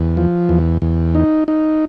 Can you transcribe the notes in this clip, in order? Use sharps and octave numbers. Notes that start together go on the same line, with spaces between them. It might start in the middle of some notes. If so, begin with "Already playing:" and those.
Already playing: E2
F3
E2
E2
D#4
D#4